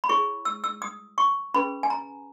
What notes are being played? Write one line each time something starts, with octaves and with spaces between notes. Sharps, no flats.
B5
E4 G#4 C#5 C#6
E6
E6
D#6
C#6
C#4 G#4 B4 B5
G#5
A#5